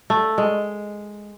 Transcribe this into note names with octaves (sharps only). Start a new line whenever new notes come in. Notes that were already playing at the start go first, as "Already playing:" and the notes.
A3
G#3